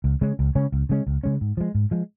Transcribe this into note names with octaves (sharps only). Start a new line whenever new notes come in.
C#2
C#3 G#3 C#4
C#2
C#3 G#3 C#4
C#2
C#3 G#3 C#4
C#2
C#3 G#3 C#4
G#2
F3 G#3
G#2
F3 G#3